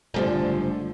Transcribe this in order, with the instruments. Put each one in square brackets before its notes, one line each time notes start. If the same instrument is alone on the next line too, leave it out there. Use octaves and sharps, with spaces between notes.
[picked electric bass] F#1 G3 A3 [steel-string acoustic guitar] G#2 D3 F3